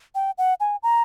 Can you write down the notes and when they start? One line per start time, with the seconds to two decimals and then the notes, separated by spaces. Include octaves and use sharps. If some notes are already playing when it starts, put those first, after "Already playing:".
0.15 G5
0.38 F#5
0.60 G#5
0.83 A#5